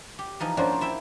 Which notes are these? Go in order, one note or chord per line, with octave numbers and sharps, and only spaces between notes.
G4
E3 F3 D#4
F3 A#3 C#4 D4 F#4 C5
E4 E5 G5